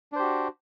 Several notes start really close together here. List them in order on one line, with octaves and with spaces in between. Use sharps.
D4 C5 G4 F#4